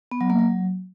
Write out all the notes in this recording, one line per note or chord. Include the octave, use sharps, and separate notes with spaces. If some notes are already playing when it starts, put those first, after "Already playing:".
B3
F#3
A#3
F#3